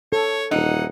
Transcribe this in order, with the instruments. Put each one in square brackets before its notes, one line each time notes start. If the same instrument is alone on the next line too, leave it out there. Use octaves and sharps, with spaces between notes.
[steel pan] A4 [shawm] C#5
[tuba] D#1 [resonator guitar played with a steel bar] E3 D#4 [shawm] F#5